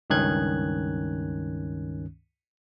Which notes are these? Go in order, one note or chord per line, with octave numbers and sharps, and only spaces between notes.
C#2 G2 D#3 C#4 F#6 G#6